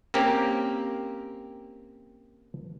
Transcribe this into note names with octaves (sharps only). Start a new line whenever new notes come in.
A#3 C4 C#4 G4 A#4